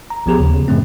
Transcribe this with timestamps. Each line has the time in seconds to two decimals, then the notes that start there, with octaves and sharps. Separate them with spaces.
0.10 A#5
0.26 B1 F3 B3 G4 G#4 A#5
0.38 D#2 C#3
0.54 C#3
0.68 F#2 A2 C#3 F3 A3 C4